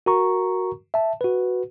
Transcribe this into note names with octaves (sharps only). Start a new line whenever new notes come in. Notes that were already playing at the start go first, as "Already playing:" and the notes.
F#4 A#4 A#5 C#6
E5 A5
F#4 B4